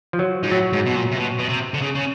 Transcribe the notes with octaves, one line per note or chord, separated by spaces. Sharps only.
F3
F#3
G#2
A2 F#3
G#2
B2
A#2
C3
B2
B2
C3
D3
C#3
C#3